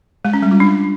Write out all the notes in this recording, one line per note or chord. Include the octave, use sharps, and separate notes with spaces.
G#3
C#4
G3
F4
D4